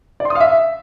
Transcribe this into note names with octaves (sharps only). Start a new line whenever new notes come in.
D5
C6
D#6
F5
E5